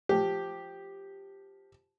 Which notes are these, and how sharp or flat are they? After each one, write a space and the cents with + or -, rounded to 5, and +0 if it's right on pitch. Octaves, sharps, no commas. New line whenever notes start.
F3 +0 G4 +0